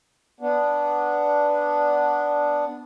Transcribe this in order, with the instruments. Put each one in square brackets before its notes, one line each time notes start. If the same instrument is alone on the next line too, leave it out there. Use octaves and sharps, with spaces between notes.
[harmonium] B3 D4